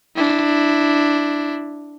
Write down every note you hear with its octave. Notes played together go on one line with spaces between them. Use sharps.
D4 E4